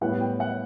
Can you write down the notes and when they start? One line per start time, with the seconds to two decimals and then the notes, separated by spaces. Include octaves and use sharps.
0.01 A2 G3 B3 F#5
0.20 G5
0.40 F#5